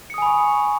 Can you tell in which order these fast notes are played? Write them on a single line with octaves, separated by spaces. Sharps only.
C#7 D#6 G#5 B5 C#6